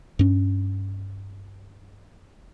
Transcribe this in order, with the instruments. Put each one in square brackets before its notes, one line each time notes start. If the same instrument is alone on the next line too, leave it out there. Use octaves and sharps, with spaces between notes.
[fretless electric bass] G2 C#4